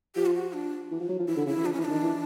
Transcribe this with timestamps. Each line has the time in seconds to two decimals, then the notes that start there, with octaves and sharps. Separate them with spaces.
0.15 F3 G4
0.26 F4
0.34 F#4
0.53 D4
0.91 E3
1.01 F3
1.09 F#3
1.19 F3
1.28 E3 E4
1.37 D3
1.46 C#3 E4
1.57 E3
1.65 F3 D4
1.73 C#4
1.77 E3
1.81 D#4
1.85 D4
1.91 D#3
2.02 E3